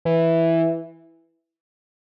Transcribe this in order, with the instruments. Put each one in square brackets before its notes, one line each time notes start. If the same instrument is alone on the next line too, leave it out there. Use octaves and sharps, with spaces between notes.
[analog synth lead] E3